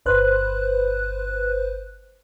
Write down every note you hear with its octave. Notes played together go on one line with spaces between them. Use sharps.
G1 B4 C5 F#6